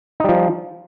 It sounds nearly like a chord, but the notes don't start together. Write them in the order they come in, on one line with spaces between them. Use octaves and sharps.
D#4 G3 F3